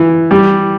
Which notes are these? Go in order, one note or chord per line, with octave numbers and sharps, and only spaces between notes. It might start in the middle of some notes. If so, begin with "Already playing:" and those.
Already playing: E3
G3